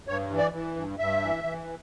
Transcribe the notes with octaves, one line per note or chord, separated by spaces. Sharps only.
G2 C#5
E3
D5
E3
G2
G2 E5
E3
E3